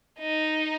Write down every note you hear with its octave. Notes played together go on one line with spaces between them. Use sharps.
D#4